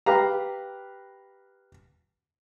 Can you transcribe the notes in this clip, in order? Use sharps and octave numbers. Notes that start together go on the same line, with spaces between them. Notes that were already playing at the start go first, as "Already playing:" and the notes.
G4 B4 F5 A#5